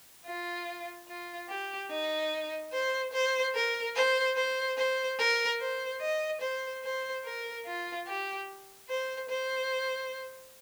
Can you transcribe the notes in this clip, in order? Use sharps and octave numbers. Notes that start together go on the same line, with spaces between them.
F4
F4
G4
D#4
C5
C5
A#4
C5
C5
C5
A#4
C5
D#5
C5
C5
A#4
F4
G4
C5
C5